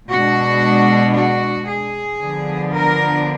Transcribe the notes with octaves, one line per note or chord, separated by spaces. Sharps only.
B2 G#3 D4 F#4
F#4
G#4
D3 F3 B3 D4
A#4